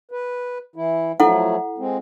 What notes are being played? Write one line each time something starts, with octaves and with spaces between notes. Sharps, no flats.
B4
E3 E4
F3 F#3 A3 E4 A4 F#5
G#3 C4